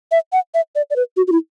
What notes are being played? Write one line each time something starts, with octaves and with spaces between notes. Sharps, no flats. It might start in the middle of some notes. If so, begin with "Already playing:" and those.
E5
F#5
E5
D5
D5
B4
F#4
F#4
E4